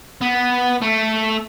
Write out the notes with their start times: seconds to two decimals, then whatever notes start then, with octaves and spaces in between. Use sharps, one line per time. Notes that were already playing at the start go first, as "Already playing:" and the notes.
0.21 B3
0.81 A3